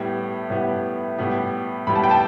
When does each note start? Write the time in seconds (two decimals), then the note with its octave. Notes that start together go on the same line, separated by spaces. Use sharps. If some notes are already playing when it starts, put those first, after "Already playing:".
Already playing: A2 G3 B3
0.50 A2 G3 B3
1.18 A2 G3 B3
1.87 A2 G3 B3 B5
1.96 A5
2.04 G5
2.11 A5